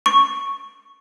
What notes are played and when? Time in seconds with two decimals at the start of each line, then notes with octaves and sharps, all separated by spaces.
0.06 C#6